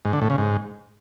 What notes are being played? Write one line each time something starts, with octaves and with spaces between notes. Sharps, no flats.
G#2
D3
A2
C#3
G#2